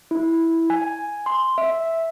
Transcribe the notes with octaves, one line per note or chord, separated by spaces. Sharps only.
E4
G#5
C6
E5